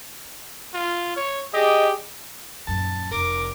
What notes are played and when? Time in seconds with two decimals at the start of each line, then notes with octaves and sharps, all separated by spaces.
0.74 F4
1.16 C#5
1.53 G4 G#4 D5 D#5
2.67 D#1 F#2 A5
3.11 F1 A#4 D6